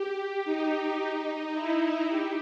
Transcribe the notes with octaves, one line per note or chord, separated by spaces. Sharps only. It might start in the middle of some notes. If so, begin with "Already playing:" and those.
Already playing: G4
D#4
E4
G4